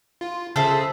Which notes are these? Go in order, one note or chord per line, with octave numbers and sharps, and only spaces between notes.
F4
C#3 G#4 A4 C5 E5